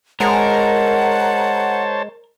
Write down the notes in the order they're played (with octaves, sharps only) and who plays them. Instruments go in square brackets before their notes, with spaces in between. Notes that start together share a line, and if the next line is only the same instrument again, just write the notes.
[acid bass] G#3 [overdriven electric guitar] A#4 [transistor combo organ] C5 C#5 A5 [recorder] F#5